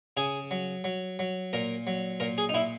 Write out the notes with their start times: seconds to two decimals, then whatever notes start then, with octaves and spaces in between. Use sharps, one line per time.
0.17 C#3 G#4
0.51 F#3
0.84 F#3
1.19 F#3
1.53 A#2 A#4
1.87 F#3
2.20 A#2 A#4
2.38 G#4
2.49 D#4
2.54 A#2 E4